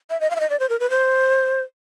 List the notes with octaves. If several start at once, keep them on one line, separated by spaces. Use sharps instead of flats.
E5
D#5
F5
E5
D#5
D5
C5
A#4
B4
C5